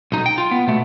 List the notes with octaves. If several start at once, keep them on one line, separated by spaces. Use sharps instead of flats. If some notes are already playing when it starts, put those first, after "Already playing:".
B1 D#4
G5
F4
B3
B2 A3